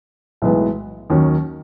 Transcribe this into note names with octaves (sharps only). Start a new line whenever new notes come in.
B1 A2 E3 G#3 B3
D#2 D#3 F#3 C#4